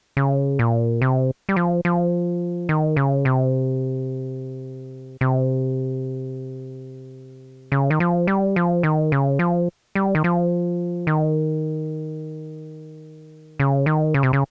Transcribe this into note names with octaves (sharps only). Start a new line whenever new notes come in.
C#3
A#2
C3
G3
F3
F3
D#3
C#3
C3
C3
C#3
D#3
F3
G3
F3
D#3
C#3
F3
G3
D#3
F3
D#3
C#3
D#3
C#3
C3
C#3